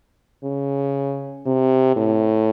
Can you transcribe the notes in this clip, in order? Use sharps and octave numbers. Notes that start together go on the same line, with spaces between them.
C#3
C3
A2